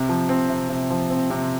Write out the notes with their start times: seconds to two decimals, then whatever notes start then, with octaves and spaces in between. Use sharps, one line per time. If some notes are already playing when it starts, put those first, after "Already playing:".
Already playing: C3
0.09 F3
0.29 C4
0.50 C3
0.69 C3
0.90 F3
1.10 C4
1.30 C3